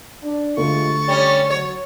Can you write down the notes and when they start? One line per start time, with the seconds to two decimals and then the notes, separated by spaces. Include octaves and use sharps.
0.23 D4
0.57 D2 G3 G#3 F4 C#6 A6
1.08 G3 C#4 C#5
1.50 F#3 C#5